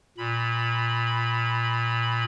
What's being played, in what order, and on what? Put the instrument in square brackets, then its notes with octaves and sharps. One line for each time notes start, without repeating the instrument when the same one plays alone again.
[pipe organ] A#2 B5